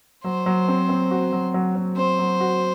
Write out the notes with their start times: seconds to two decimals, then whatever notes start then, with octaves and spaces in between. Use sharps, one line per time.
0.24 F#3 C5
0.46 F#3
0.68 C4
0.89 C4
1.11 F#4
1.32 F#3
1.54 F#3
1.76 F#3
1.97 C4 C5
2.19 F#3
2.40 F#4